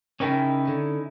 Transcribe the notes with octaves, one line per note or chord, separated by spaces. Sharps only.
C#3 C#4 D#4 E4 A#4 G5
D3